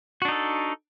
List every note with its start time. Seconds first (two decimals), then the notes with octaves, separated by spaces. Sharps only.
0.22 F#4
0.25 D4
0.28 D#4
0.32 A4